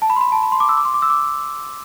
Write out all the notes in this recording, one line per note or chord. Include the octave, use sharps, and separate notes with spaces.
A5
B5
C6
B5
A5
B5
C6
D6
E6
D6
C6
D6
E6
D6